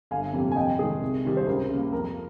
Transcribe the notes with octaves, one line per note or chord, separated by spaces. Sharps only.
G1 F5 G#5
F2 C3 G3 A#3
G#5
F2 D#5 G5
C3 D#3 G#3 G#4
C2
C3 D#3 G3
C5
C#2 A#4
C#3 G3 A#3
F2 A#4